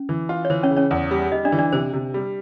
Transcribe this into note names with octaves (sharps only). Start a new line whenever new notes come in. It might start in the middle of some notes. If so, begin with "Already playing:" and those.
Already playing: C#4
E3
F4
C#5
E3 C5
C#4 C#5
C#3
C#4 C#5
E2
G3
G3 D#4 D#5
D4 D5
E3
D4 D5
C3 C5
C3
G3